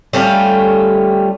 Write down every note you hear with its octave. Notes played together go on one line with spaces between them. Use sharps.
G3 A3 C#4 F4